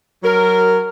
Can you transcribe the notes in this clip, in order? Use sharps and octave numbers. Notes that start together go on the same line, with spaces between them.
F#3 A#4